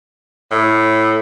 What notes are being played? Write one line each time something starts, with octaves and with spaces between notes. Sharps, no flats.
A2